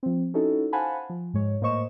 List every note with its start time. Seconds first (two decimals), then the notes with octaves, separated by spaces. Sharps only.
0.03 F3 C4
0.34 C#4 D#4 E4 F#4 A4
0.73 C5 F5 F#5 G#5 A5 B5
1.10 F3
1.34 G#2 G#3 C#5
1.61 A2 A#3 C5 D#5 C#6 E7